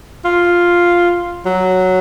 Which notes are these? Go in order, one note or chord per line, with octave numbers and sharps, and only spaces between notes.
F4
F#3